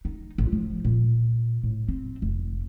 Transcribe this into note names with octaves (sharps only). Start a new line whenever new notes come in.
D#4
A1
F3
A#2
A2
C4
F1